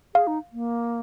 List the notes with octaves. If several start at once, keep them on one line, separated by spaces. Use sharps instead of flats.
G#4 F5
D#4
A#3